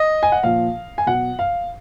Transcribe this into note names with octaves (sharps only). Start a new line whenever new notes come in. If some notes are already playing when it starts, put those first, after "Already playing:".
Already playing: D#5
G#5
F#5
A#2 F3 F5
G#5
B2 F#3 F#5
F5